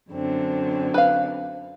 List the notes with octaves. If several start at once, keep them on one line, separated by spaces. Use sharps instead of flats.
F#2 D3 C4
B4 F5